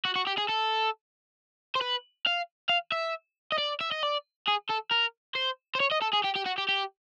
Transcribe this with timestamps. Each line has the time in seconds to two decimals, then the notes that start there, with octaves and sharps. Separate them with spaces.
0.05 F#4
0.16 F#4
0.27 G4
0.38 G#4
0.49 A4
1.75 C5
1.81 B4
2.26 F5
2.69 F5
2.92 E5
3.52 D#5
3.58 D5
3.81 E5
3.92 D#5
4.03 D5
4.47 G#4
4.69 A4
4.91 A#4
5.35 C5
5.75 C5
5.80 C#5
5.91 D#5
6.02 A4
6.13 G#4
6.24 G4
6.35 G4
6.46 F#4
6.58 G4
6.69 G4